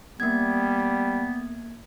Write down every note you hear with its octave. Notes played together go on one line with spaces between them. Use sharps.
G3 A#3 B3 G#6